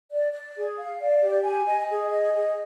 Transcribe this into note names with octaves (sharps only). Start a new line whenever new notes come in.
D5
D5
G#4
F5
D5
G4
G#5
D#5
G#4
D#5
G#4